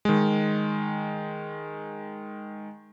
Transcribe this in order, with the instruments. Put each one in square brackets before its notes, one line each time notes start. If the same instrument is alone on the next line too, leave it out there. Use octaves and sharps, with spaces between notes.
[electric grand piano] D#3 G#3